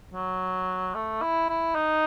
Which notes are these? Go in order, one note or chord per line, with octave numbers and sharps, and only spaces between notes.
F#3
A3
E4
E4
D#4